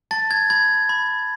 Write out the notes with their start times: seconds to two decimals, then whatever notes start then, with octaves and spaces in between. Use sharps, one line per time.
0.11 A5 A6
0.31 G#6
0.50 B5 G#6
0.89 B5